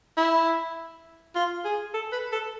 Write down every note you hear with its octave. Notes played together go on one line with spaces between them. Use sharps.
E4
F4
G#4
A4
B4
A4